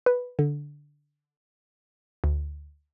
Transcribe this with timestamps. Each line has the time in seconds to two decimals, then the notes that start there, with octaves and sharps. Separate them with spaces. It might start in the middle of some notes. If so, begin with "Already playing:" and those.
0.06 B4
0.39 D3
2.24 D2